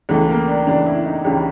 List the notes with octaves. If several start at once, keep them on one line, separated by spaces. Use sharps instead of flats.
C#2 C#3 E3 A3
A#3
D4
C#2 C#3 E3 D4
E4
D#4
C#2 C#3 E3 G4